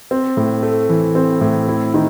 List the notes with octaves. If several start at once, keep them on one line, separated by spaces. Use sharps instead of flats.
C4
A2
A3
E3
C4
A2
E4
D#3